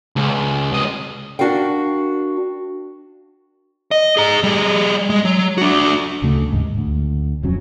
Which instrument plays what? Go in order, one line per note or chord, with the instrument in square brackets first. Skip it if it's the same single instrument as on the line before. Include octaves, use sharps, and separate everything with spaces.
[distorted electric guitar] C#2
C2 D#5
[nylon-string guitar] D4 F#4 A#4 F5 G5
[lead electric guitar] D#5
G#4 A#5
G3 G#4
G#3
F#3
D4 F#4
[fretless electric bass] D2 C#3 A3
D#2 G#2
D2
D#1 F2 F#3 C#4